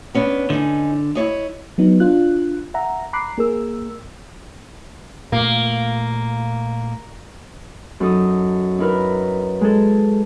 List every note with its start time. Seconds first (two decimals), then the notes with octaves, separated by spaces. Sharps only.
0.15 B3 C#4 D4
0.50 D3 C#4 D#4
1.15 E4 C#5 D#5
1.78 F#3 B3 D#4
2.00 D4 F4 F#6
2.74 E5 F#5 A#5
3.13 A#5 B5 D6 F#6 C7
3.38 A#3 G#4 A#4 E6
5.32 A#2 A3 A#3
8.00 F#2 D#4 A4 D#6
8.79 D#4 E4 A#4 B4
9.61 G#3 G#4 A4